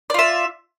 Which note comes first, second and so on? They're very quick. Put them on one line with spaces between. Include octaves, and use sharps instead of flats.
D5 F4 E5